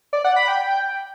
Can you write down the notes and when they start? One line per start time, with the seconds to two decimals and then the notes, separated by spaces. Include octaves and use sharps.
0.13 D5
0.25 F#5
0.36 B5
0.48 G5